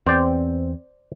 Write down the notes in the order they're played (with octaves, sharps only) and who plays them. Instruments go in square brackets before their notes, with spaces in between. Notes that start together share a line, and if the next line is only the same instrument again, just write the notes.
[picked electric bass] E2 [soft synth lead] C4 [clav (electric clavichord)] C5 D5 G5